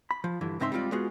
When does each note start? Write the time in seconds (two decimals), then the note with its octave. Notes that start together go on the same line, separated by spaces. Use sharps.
0.11 B5
0.24 F3
0.41 G2 D3 E3
0.60 G#2 C#3 C4 D#4 E5 C6
0.72 G3 G#3 C4 F4 D5
0.92 G#3 B3 F4 F#4 G#4